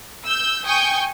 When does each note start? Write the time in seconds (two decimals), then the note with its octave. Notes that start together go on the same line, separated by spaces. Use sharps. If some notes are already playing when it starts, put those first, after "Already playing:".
0.25 E6 G6
0.64 G5 G#5 C#6 D#6 G6